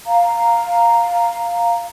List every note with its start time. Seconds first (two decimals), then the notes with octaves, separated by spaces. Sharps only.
0.06 F5 A#5